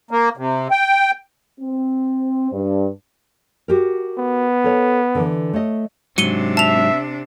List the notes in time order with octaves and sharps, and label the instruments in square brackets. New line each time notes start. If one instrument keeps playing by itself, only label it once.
[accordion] A#3
C3
G5
[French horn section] C4
G2
[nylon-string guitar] F#4 G4 A#4
[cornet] B3
[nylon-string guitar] A4 C#5
D3 E3
A3 C#5 D#5
[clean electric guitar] G#2 F#3 [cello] C3 D4 [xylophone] C#7 D#7 G7
[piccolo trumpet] E5 [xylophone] A5 F7